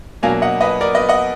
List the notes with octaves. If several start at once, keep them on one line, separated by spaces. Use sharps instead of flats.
B2 F#3 A#3 D4 F5 G#5
D#5 F#5
B4 D#5
A#4 D5
B4 D#5
D#5 F#5